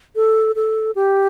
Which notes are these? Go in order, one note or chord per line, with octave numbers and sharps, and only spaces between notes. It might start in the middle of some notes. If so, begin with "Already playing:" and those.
A4
A4
G4